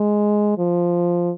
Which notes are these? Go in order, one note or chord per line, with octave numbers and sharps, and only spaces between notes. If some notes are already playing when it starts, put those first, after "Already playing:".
Already playing: G#3
F3